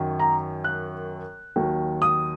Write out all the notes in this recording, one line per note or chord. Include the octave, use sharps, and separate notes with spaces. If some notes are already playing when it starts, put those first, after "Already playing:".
Already playing: F#2 D#3 F#3
A#5
F#6
D#2 D#3 F#3
D#6